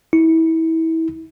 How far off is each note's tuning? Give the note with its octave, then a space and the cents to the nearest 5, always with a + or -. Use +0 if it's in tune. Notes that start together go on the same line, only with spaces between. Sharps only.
E4 -30